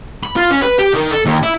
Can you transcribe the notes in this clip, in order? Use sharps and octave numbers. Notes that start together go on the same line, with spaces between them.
B5
F4
C#4
B4
G4
D#3
A4
D#2
E4